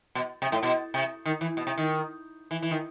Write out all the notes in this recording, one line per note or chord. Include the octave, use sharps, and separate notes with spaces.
B2
C3
A2
B2
C3
D#3
E3
B2
C3
D#3
E3
E3
D#3